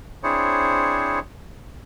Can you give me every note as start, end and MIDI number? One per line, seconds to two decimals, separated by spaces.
0.24 1.19 60
0.24 1.19 62
0.24 1.19 64
0.24 1.19 68
0.24 1.19 72
0.24 1.19 73